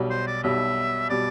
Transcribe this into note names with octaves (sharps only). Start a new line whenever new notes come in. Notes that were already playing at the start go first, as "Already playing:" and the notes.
Already playing: B1 B2 G3
C5
D5
B1 B2 G3 E5
B2 G3 D5